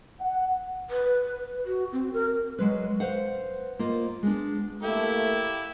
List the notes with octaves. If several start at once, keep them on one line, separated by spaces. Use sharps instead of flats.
F#5
B4
F#4
C4
A#4
F#3 G#3 B4
B4 C5 F5 F#5
A#3 F4 C5 D#5
G#3 B3 D4
A3 A#3 E4 G4 A4